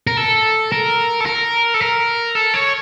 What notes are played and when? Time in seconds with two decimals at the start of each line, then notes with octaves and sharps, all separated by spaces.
0.07 A#4
0.17 A4
0.72 A#4
1.20 A4
1.26 A#4
1.74 A4
1.81 A#4
2.35 A4
2.54 C#5